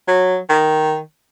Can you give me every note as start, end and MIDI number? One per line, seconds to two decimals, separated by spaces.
0.08 0.39 54
0.50 0.99 51